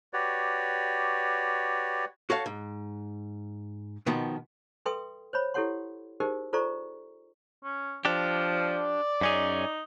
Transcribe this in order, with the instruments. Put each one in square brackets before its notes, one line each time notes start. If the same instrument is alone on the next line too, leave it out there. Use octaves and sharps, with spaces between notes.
[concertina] F#4 G4 B4 C#5 D5
[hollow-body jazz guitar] F#4 A4 C#5 F5
G#2
B2 D#3 F3 B3
[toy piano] A4 B4 E5 G5 C6 D#6
C5 C#5 B5
E4 G4 A4 C#5 F#5 C6
D#4 G4 G#4 A#4 C5 D#5
F4 A4 C5 D5 A#5 C#6
[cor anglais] C#4
[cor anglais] F3 [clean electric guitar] D4 G4
[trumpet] D5
[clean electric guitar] F#2 C#4 G#4 [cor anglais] D#4